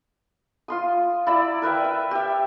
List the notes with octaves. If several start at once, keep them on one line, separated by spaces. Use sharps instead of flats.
F4 C6 D#6
E4 D5 A#5 E6
A#4 B4 E5 G5
E5
G4 E5